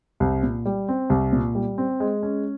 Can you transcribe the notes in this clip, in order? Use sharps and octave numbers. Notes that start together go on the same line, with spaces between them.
C2
A#2
G3
C4
C2
A#2
G3
C4
G#3
C#4